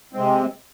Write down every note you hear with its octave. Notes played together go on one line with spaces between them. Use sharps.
C3 G#3 C4